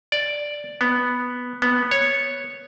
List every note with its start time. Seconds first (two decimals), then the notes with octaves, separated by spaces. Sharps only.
0.12 D5
0.81 B3
1.62 B3
1.91 C#5